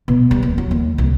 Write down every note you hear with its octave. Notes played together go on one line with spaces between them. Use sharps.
B2
G3
D#1
F#3
D#2
C2